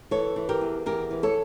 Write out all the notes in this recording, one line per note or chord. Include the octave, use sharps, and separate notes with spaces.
E3 A4 C#5
E3
G4 A#4
E2
E2 G4 A#4
E3
A4 C#5